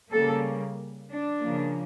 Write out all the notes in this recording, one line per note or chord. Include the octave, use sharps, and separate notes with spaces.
C#3 G3 A#3 A4
D4
C#3 F3 A#3